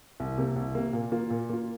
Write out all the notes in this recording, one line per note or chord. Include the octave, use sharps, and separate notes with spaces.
C2
C3 A#3
C2
C3 A#3
A#2
A#3 F4
A#2
A#3 F4